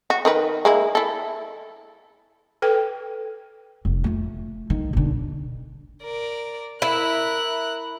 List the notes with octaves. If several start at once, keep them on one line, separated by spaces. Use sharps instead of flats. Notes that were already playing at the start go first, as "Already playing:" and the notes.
F#4
D#3 A#4 B4
G#3 A#3 E4
E4 A4
A4 B4 G5
F1
A3 F4
D#3
B1 D3
A#4 D5
E4 A#4 F#6